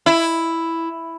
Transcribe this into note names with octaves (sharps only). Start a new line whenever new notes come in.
E4